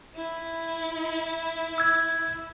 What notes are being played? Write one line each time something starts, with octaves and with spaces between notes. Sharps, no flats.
E4
E6 G#6